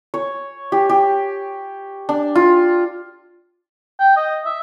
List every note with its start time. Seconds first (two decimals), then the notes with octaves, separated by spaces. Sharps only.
0.14 C#5
0.72 G4
0.89 G4
2.09 D4
2.35 F4
4.00 G5
4.17 D#5
4.45 E5